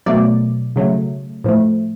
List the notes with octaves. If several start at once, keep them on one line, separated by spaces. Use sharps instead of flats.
B2 F#3 A3 D5
C#3 F#3 A3
A2 F3 A3